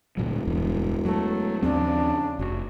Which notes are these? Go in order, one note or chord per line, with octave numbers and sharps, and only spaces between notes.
E1 D2 A#2 F#3
D1 E2 G2
F#3 A3
D#2 C#3 F3 C4 D4
F1 F#4